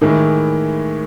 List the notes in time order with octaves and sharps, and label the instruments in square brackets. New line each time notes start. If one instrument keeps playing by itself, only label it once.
[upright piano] A2 E3 G#3 [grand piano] D#3